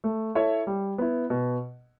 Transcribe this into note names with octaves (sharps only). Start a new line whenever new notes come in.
A3
E4 A4 C#5 E5
G3
B3 E4
B2